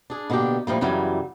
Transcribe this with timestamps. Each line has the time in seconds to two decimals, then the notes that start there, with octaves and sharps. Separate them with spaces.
0.10 D4 G#4
0.30 B2 D3 A#3 D4 G4
0.67 A2 F3 G3 A#3
0.81 F#2 C#3 E3 F#3 G3